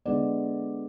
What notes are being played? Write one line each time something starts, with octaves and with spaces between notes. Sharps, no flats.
D3 G#3 B3 D5